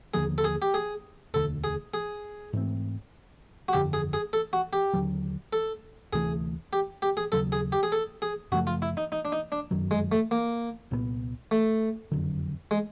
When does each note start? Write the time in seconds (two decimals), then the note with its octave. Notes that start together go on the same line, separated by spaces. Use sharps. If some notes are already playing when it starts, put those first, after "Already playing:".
0.14 D#2 D3 F3 A#3 G#4
0.38 A4
0.44 G#4
0.62 G4
0.74 G#4
1.34 E1 D2 D3 A4
1.64 G#4
1.94 G#4
2.53 G#2 E3 A3 C4
3.68 F#4
3.73 G1 F2 D3 G4
3.93 G#4
4.13 G#4
4.33 A4
4.53 F#4
4.73 G4
4.93 D#2 D3 F#3
5.53 A4
6.13 D2 C3 E3 A3 G#4
6.73 G4
7.02 G4
7.17 G#4
7.32 D#2 C#3 F#3 A4
7.52 G#4
7.72 G4
7.83 G#4
7.92 A4
8.22 G#4
8.52 F#2 C#3 F3 A3 F#4
8.67 F4
8.82 E4
8.97 D#4
9.12 D#4
9.25 D4
9.32 D#4
9.52 D4
9.71 G1 F#2 D#3 F#3
9.91 G#3
10.12 A3
10.31 A#3
10.91 C2 A#2 F#3 B3
11.51 A3
12.11 F#1 F2 D3 F#3
12.71 G#3